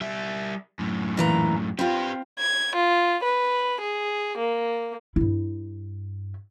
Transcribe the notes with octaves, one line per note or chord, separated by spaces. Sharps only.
G3 E5
F#2 A2
A#2 E3 A#5
C4 F4 G4 B4
G#6
F4
B4
G#4
A#3
G2 E4